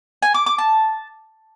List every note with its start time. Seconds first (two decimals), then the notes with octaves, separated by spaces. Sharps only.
0.22 G#5
0.34 D6
0.46 D6
0.58 A5